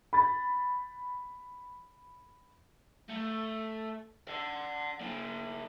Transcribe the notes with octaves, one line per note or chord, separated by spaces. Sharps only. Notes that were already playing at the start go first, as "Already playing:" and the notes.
B5 A6
A3
D5 F#5
A#3 E4